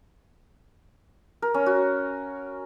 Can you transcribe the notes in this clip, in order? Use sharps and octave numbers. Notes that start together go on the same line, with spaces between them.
A#4
C#4
F#4